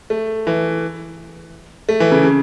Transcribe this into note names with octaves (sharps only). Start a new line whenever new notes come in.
A3
E3
A3
E3
C#3
C#3